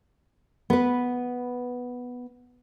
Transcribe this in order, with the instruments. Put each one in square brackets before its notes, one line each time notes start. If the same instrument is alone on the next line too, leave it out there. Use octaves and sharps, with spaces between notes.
[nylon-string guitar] B3 B4